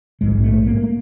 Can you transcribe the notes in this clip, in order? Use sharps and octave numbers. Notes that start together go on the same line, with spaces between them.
A#1 G#2 G#3
A3
A#3